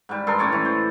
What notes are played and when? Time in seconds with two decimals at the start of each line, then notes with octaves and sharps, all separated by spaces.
0.09 G#2 G3
0.27 G2 A4 A#4 C6
0.39 A2 C#4 C#5 D5
0.52 E3
0.65 C5